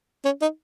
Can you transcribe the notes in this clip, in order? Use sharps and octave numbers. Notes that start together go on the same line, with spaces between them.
C#4
D#4